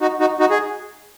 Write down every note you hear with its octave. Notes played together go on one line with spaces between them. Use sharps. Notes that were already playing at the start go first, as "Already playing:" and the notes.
D#4 F#4
D#4 F#4
D#4 F#4
G#4